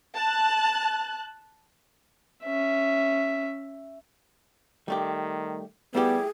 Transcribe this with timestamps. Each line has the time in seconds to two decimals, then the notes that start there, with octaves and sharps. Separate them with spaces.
0.15 A5 F#6
2.44 C#4 E5
4.88 D#3 G3 A3 G4
5.95 G3 A3 B3 E4 G4 G#4